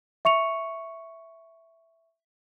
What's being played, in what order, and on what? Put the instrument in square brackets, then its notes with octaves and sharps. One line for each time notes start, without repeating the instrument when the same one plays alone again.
[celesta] E5 C#6 C#7 F7